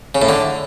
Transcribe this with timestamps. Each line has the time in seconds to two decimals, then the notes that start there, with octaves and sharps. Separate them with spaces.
0.15 C#3
0.22 A2
0.29 D3